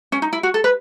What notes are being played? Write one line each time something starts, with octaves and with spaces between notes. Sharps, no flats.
C#4
D#4
E4
F#4
A4
B4